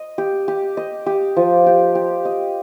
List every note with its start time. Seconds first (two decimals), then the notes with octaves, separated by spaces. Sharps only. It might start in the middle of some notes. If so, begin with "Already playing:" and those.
Already playing: D#5
0.18 G4
0.48 G4
0.77 D#5
1.06 G4
1.37 F3
1.66 G4
1.95 G4
2.25 D#5